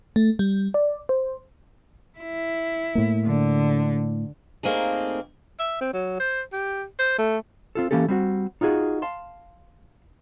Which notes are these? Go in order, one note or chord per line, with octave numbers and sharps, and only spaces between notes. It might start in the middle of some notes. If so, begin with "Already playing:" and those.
A3
G3
D5
C5
E4
A2 A#3
D3
A#2 A3 A#3 C4 D#4 G#4
E5
C4
F#3
C5
G4
C5
A3
C4 F4 A4
E3 A#3 C#4 G4 A4
G3 C4 F#4
D#4 F4 F#4 G#4
F5 A5 C6